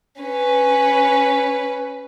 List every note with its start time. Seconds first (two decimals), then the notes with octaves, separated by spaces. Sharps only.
0.22 C#4 B4